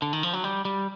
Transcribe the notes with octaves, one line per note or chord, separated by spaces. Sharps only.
D3
D#3
F3
F#3
G3
G3